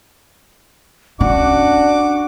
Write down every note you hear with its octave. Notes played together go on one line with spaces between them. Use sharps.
C#4 D4 F#4 F#5 D6